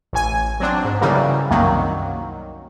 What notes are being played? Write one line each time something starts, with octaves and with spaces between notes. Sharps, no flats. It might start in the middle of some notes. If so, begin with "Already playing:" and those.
A1 G#5
F#3 C4 D4
G#2
C#3 E3 F#3 G3 A#3
C2 F#2 D#3 F#3 A#3